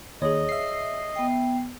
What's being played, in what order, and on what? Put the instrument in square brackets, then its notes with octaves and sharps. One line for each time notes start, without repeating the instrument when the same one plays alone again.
[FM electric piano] D#2 [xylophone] G#4 C#5 [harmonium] D#5
[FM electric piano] E5 C7
[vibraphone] B3 G5